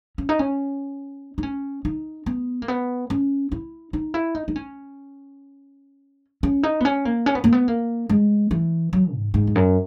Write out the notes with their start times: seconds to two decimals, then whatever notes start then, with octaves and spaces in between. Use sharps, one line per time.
0.18 C#4
0.29 D#4
0.39 C#4
1.38 D#4
1.43 C#4
1.85 D#4
2.26 B3
2.62 A#3
2.68 B3
3.10 C#4
3.52 E4
3.93 D#4
4.14 E4
4.35 D#4
4.48 D#4
4.56 C#4
6.43 C#4
6.63 D#4
6.80 B3
6.85 C#4
7.05 A#3
7.26 C#4
7.35 B3
7.44 A#3
7.53 B3
7.68 A#3
8.09 G#3
8.51 E3
8.93 F#3
9.14 G#2
9.34 G#2
9.47 E2
9.55 F#2